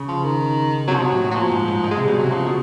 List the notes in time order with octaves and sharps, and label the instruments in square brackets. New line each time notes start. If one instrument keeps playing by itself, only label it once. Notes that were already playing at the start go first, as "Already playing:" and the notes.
Already playing: [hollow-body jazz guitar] C#3
[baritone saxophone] F3
D#3
[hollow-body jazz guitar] C3 [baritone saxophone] F#3
[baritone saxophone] F3
[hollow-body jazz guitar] B2 [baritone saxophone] F#3
[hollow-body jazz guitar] A2
A2
[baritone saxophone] F#3
[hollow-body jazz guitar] A#2 [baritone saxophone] F3
[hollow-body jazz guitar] G#2
G#2
G#2
[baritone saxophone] G#3
[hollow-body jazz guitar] C3
[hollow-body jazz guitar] B2 [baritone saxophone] G3
[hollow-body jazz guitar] C3 [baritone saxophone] F#3
[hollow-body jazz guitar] C#3 [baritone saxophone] F3
[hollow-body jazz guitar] B2